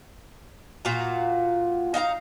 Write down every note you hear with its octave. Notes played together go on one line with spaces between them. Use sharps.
A#2 F4 F#4 A#5
D#4 F5 F#5 A#5